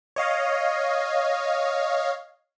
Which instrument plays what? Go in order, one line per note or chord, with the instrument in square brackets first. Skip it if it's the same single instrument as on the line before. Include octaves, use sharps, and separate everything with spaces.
[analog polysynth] C#5 D#5 F5